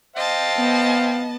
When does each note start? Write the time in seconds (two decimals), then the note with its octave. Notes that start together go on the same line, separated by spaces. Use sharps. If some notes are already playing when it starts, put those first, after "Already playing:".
0.16 C5 D#5 F5 G5 A5
0.58 B3